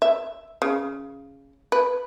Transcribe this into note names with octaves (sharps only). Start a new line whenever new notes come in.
E5
C#3
B4